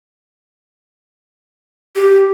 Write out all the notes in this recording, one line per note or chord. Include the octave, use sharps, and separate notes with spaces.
G4